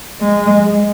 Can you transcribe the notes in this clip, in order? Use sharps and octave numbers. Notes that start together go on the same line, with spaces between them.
G#3